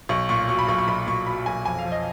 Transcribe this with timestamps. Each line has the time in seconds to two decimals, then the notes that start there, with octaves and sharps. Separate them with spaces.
0.09 B1 C#6
0.29 A#2 C#6
0.49 F#3 C#6
0.59 B5
0.68 B1 C#6
0.79 C#6
0.88 B1 B5
1.07 A#2 C#6
1.26 F#3 B5
1.46 B1 G#5
1.65 F2 G#5
1.79 F5
1.85 F3
1.92 D#5